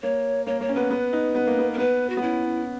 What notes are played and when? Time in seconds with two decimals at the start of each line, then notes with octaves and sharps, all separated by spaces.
0.03 A#3 C#5
0.47 A#3 C#5
0.61 A#3 C#5
0.69 C#4
0.75 B3 B4
0.91 B3
1.13 D#4
1.35 B3
1.47 A#3
1.59 B3
1.74 A#4
1.78 B3 B4
2.10 F#4
2.17 B3
2.22 C#4 E4
2.44 C#4